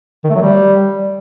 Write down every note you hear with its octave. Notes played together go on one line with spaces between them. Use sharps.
D#3
A3
F#3
G3